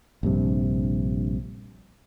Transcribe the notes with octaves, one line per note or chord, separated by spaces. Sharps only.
A#1 G2 C3